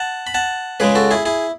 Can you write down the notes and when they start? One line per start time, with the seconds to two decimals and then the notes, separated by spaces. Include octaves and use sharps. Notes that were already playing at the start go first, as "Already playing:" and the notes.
Already playing: F#5 A5
0.27 B5
0.34 F#5 A5
0.80 C#2 C#3 G#3 G#4 B4
0.95 F#4 A4
1.11 E4 G#4
1.25 E4 G#4